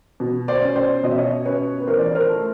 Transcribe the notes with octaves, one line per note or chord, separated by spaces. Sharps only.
B2
C5 D5
C#4
C5 D5
B2 D#5
E5
C#5 D#5
C#4 B4 C#5
B4
E3 A#4 C5
D5
C#5
A#4 C5
A3